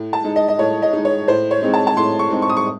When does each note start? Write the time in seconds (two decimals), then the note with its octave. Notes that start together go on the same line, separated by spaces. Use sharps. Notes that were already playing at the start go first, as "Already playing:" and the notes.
Already playing: A2
0.13 A5
0.24 G#3 D#4
0.36 D#5
0.48 D#5
0.59 A2 C#5
0.82 D#5
0.93 G#3 D#4
1.05 C#5
1.28 A2 C5
1.51 C#5
1.62 G#3 C4 D#4
1.74 A5
1.87 A5
1.97 A2 C6
2.19 C#6
2.30 G#3 C4 D#4
2.42 C#6
2.50 D#6
2.57 C#6